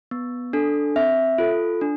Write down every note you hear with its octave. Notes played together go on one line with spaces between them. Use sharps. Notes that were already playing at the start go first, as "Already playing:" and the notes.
B3
D4 A4
C4 E5
F4 A4
D4